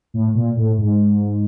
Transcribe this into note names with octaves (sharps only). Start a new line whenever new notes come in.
A2
A#2
A2
G#2